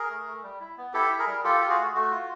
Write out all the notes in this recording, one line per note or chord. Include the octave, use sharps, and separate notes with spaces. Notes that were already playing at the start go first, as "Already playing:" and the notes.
Already playing: G#4 A#4
A3
A3
G3
E4
B3
E4 G4 A4
E4
G#4 A#4
G3
F4 G4 A4
F4 G4
F#4 G#4
A3
A3 F#4
F4